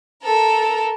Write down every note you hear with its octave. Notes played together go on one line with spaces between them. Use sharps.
A4 A#4